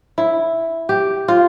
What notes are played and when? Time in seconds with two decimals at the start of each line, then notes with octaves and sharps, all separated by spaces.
0.18 E4
0.89 G4
1.28 F4